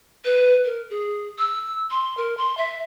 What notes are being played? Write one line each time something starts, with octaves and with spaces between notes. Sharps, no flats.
B4
A#4
G#4
E6
C6
A#4
C6
E5